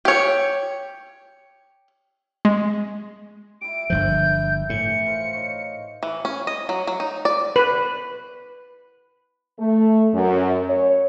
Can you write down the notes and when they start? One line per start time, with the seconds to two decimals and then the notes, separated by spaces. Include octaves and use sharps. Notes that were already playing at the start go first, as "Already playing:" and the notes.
0.05 G4 C#5
2.45 G#3
3.61 E4 G4 D7
3.90 G1 G2 F3 A#4 E5 A#5 G6
4.70 A2 E3 C#7
5.07 A#4 C5 F5
5.34 D#4 C#5
6.03 E3
6.25 C#4
6.47 D#5
6.69 F#3
6.87 F#3
7.00 D#4
7.25 D5
7.56 B4
9.59 A3
10.12 F#2
10.68 C#5